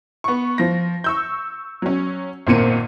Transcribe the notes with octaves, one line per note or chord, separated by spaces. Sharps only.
B3 C#6
F3 A#6
C#6 E6 G6
F#3 C#4
G#1 A#2 A#3 C4 C#7 D#7